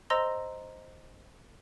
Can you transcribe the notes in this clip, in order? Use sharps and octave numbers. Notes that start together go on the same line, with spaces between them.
C5 D#5 A#5 C6 E6 A#6